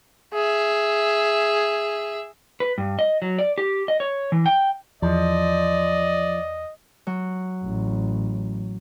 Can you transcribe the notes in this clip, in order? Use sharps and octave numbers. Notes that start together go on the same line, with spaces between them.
G#4 E5
B4
G2
D#5
F#3
D5
G4
D#5
C#5
E3
G5
E2 F3 D5 D#5
F#3
A1